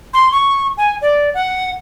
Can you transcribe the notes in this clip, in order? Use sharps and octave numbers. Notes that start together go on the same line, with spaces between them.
C6
C#6
G#5
D5
F#5